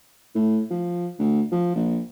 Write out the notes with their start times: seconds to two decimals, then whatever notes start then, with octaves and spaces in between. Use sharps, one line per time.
0.35 A2
0.71 F3
1.19 D2
1.52 F3
1.75 A#1